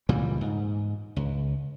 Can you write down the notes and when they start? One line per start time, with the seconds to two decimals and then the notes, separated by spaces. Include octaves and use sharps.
0.09 C#2 A#2 E3 G3
0.41 G#2
1.16 C#2